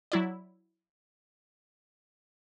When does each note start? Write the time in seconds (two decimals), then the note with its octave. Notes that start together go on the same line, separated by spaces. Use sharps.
0.12 F#3 E4 D5